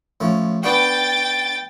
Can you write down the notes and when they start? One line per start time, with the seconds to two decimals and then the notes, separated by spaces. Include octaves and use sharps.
0.20 A2 F3 C#4
0.64 B3 D4 F#4 G5 A6